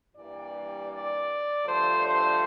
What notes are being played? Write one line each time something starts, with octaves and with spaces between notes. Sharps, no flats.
G2 E3 G3 A#3 D5
D5
G2 D3 F3 A3 C5
C5